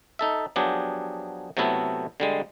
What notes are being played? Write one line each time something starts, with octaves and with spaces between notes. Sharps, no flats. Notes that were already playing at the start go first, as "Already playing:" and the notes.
D#4 A4 E5
F3 F#3 B3 D4 G4 G#4
C3 F#3 A3 B3 E4 A4
D3 G3 G#3